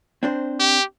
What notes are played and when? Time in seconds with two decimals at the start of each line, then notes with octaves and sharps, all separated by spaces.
0.23 C4 D4 C5
0.59 G4